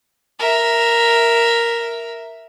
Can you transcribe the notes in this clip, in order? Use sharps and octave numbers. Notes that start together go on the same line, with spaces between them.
A#4 E5